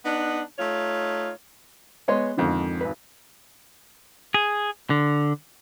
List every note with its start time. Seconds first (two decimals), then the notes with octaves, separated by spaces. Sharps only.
0.05 B3 D4 D#4
0.59 A3 D#4 F4 C#5
2.08 G#3 B3 C#5 D#5 C6
2.37 F2 G#2 D3 D#3 F3
2.81 G#1 B4
4.34 G#4
4.90 D3